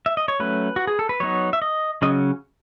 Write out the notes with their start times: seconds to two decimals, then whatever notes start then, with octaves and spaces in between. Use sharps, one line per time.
0.06 E5
0.17 D#5
0.28 C#5
0.40 F#3 A3 C#4 B4
0.76 F#4
0.87 G#4
0.99 A4
1.09 B4
1.20 F#3 B3 D#4 C#5
1.53 E5
1.62 D#5
2.02 C#3 F#3 C#4 D#5